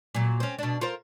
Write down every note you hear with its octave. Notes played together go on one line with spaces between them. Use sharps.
A#2 F#3
C4 C#4
B2 D4
F4 A#4 C5